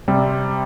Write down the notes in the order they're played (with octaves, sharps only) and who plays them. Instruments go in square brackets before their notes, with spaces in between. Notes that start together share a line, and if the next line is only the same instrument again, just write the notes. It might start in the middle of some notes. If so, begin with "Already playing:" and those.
[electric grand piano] C3 G3 C4